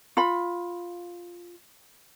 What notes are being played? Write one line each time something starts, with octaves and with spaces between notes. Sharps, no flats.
F4 B5